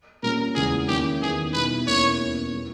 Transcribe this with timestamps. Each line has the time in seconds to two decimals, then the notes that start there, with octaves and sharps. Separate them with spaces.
0.23 A#2 G3 A#3 C#4 A#4
0.55 E2 C#3 G#3 G#4
0.88 D#3 A#3 C#4 E4 G4
1.21 E2 D#3 G3 B3 D#4 G#4
1.53 B2 G3 B3 E4 B4
1.87 E2 B2 A#3 C#4 E4 C#5
2.20 E2 B2 A#3 C#4
2.52 G3 B3 E4